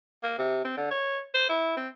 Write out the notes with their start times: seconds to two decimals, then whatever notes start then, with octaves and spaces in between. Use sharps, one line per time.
0.23 A#3
0.38 C3
0.65 C4
0.77 D3
0.91 C#5
1.34 C5
1.49 E4
1.77 C4